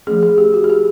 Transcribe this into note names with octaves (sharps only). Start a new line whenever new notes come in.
F3 A3 C#4 G#4
G#4
G4
F#4
G#4
G4